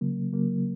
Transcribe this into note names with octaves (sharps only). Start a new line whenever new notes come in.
C#3 F#3 A#3
C#3 F#3 A#3